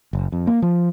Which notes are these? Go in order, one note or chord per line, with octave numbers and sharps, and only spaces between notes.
F#1
F2
A#3
F3